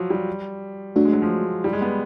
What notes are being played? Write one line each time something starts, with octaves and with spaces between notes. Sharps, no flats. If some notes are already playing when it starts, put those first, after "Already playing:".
Already playing: F3 F#3
G3
F#3 A3 D4 F#4
G#3
F#3
F3
G3
G#3
B3